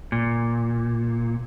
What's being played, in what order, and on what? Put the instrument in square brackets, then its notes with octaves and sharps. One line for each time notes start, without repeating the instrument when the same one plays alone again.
[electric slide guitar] A#2